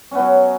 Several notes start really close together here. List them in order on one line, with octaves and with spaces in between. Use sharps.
C#4 B3 F#3